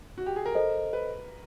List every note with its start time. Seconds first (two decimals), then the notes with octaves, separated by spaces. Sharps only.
0.18 F#4
0.26 G4
0.36 G#4
0.46 A#4
0.55 A4 C5 D#5
0.93 B4